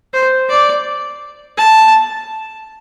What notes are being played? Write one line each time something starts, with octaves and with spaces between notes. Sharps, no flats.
C5
D5
A5